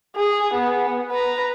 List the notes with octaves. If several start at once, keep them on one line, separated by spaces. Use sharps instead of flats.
G#4
B3
B4 A#5